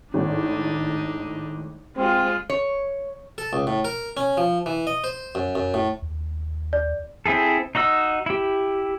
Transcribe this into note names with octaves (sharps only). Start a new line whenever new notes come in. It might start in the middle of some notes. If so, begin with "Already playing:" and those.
G#1 A2 D4 D#4
G#3 C4 F4
C#5
A4
C#2
A2
A#4
C#4
F3
E3
D#5
C5
F#2
F#2
A2
D#2
D5
C4 E4 G#4 A4
D#4 F#4 D#5 E6
E4 G4